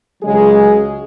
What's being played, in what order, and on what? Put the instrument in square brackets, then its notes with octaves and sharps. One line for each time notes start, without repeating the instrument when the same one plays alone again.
[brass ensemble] C#2 C#3 F#3 G#3 G#4